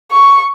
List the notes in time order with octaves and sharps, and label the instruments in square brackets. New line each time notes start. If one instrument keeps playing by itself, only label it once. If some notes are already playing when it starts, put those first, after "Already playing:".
[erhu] C#6